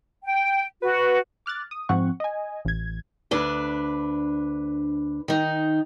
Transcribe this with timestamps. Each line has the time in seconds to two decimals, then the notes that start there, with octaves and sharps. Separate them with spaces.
0.25 G5
0.82 F#4 B4
0.99 B4
1.46 D6 F6 F#6 A6
1.71 D#6
1.89 G#2 F3 C4 F#5 C#6
2.20 D#5 G#5
2.65 A1 G#6
3.31 D2 D4 B4
5.28 D#3 D#4